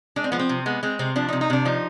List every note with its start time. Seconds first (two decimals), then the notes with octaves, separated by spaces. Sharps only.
0.16 G#3 D4
0.24 C4
0.32 F3 B3
0.40 C4
0.49 C3
0.66 G#3 B3
0.83 G#3 C4
0.99 C3 C4
1.16 F3 D4
1.29 D#4
1.33 C3
1.41 D#4
1.50 C3 D4
1.65 F3 D#4